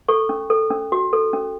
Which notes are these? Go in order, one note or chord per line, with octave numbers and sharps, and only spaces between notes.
A4 C#6
C#4
A4
C#4
F#4
A4
C#4